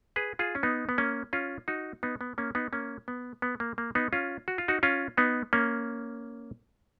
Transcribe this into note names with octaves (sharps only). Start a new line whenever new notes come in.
G#4 B4
F4 G#4
C#4
B3 D#4
B3
A#3 C#4
C#4 F4
D#4 F#4
B3 D#4
B3
A#3 C#4
B3 D#4
A#3 C#4
B3
B3
A#3
A#3
B3 D#4
C#4 F4
F#4
F4
D#4 F#4
C#4 F4
B3 D#4
A#3 C#4